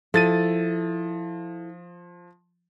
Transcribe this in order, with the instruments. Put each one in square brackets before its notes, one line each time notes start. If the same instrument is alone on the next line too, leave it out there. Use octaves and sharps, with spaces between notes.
[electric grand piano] F3 A6 D#7 [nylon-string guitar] E4 A4